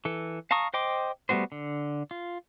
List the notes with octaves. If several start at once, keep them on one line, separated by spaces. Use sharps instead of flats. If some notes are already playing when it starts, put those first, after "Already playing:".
E3 A4
F5 A5 A#5 C#6 D#6
C5 D#5 G5 C6 D6
G3 A3 B3 F#4 C5
D3
F4